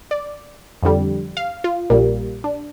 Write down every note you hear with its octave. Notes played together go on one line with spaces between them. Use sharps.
D5
F2 D3 G3
F5
F4
A#1 A#2 G3 A#3
D4